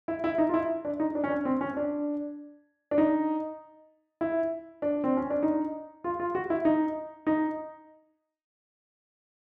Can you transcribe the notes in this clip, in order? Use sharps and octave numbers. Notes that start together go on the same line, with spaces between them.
E4
E4
D#4
F4
E4
D4
D#4
D4
C#4
D4
C4
C#4
D4
D4
D#4
E4
D4
C4
C#4
D4
D#4
F4
F4
F#4
E4
D#4
D#4